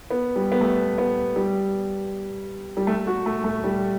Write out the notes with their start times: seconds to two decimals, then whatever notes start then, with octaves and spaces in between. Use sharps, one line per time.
0.11 B3
0.36 G3
0.52 B3
0.61 A3
0.98 B3
1.36 G3
2.77 G3
2.87 A3
3.07 F#4
3.26 A3
3.44 A3
3.64 G3